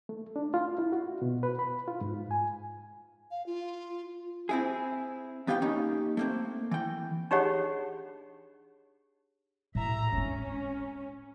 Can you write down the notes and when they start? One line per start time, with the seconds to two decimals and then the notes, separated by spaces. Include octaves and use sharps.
0.09 A3
0.36 D4
0.54 F4
0.78 E4
0.92 F#4
1.22 B2
1.43 B4
1.59 B5
1.88 F4
2.01 G#2
2.31 G#5
3.31 F5
3.46 F4
4.49 C4 E4 G#4
5.47 E2 B3 G4 F5 G5
5.62 A#3 C#4 D#4 G4
6.17 A3 A#3 C4
6.71 E3 G5
7.31 D4 D#4 G4 G#4 C#5 F#5
9.75 A2 E5 A#5
10.12 G#3 C4 C#4